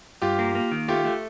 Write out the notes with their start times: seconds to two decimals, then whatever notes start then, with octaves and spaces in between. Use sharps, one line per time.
0.22 G2 F4 G4
0.39 A#3
0.55 A#3
0.72 D#3
0.88 A3 F4 G4
1.05 A3